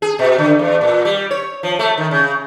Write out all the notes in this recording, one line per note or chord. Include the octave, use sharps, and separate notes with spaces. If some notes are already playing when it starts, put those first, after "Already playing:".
G#4
B2
D3
E2
A#2
G3
C#5
F3
A3
D#3
C#3